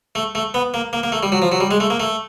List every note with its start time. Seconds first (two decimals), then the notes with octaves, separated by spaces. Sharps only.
0.15 A3
0.35 A3
0.54 B3
0.74 A#3
0.93 A#3
1.03 A#3
1.12 A3
1.23 G3
1.32 F#3
1.42 F3
1.52 F#3
1.60 G3
1.71 G#3
1.80 A3
1.90 A#3
2.00 A3